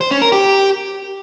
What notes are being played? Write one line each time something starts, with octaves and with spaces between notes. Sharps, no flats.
C5
C#4
A#4
G4